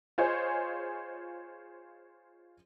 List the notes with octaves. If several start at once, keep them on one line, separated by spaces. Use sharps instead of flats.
F4 G#4 C5 C#5 D#5